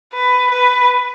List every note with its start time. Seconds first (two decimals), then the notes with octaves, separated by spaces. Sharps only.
0.14 B4
0.51 B4